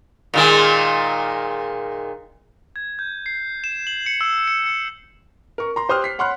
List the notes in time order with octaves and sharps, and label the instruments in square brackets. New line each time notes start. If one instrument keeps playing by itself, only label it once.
[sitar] A#2 D#3 G#3
[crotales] G#6
G6
C7
E7
F#7
C#7
E6
C#7
C#7
[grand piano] A#4 C#6
A#5 C6
G4 C5 C6 D#6 F6 F#6
B6 C7
C#5 F#5 B5 C6 F6 F#6